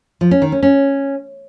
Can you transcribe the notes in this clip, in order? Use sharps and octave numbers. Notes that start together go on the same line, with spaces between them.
F3
C#4
D#3
C#4
C#4